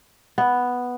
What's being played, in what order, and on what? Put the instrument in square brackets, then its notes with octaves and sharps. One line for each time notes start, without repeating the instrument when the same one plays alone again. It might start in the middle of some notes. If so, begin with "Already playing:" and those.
[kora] B3